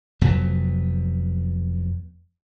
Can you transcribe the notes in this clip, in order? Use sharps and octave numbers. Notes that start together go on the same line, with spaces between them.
F1 F2 F#3 B3